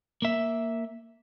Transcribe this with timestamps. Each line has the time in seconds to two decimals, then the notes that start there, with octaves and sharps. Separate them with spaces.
0.22 A#3 E5